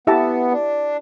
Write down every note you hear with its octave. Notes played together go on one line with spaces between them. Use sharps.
B3 E4 G4 E5 A5
D4